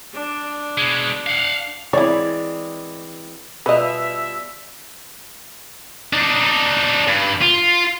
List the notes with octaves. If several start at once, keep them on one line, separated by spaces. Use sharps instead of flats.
D4
B2 G#3
F5 F#5
E3 G#3 C4 E4 C#5 D5
B2 G3 F4 B4 D#5 E5
D4 D#4
G2
F4